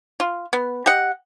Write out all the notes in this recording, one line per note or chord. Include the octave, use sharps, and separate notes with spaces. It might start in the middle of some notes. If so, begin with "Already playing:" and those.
F4
B3
G4 D#5 F#5